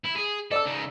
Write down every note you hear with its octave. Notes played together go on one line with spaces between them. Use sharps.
E4
G#4
A4 D5 E6
C#3 D#4